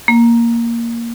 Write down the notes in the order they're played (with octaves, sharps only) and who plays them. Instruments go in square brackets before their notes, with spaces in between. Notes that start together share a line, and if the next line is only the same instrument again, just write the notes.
[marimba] A#3